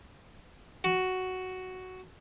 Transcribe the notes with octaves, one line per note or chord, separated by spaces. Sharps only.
F#4